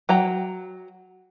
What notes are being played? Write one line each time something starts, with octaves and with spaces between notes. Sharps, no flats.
F#3 G5 A#5